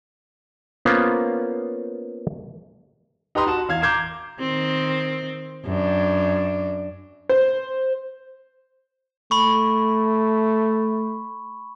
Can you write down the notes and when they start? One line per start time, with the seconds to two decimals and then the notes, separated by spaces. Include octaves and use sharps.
0.85 A#3 B3 C#4 F4 C5 F5
3.35 D#4 G4 B4 A#5 C6 D#6
3.47 F#4 A5 E7
3.69 E2 F5 G#6
3.82 A#5 D6 G6 G#6 C7 E7
4.40 D#3 C4
5.65 F#2 D4
7.29 C5
9.31 A3 B5 C#6